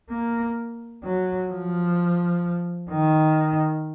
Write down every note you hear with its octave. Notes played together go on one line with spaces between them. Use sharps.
A#3
F#3
F3
D#3